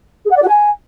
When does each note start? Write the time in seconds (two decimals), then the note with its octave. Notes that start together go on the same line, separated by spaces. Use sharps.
0.24 G#4
0.30 F#5
0.36 D5
0.41 F#4
0.47 G#5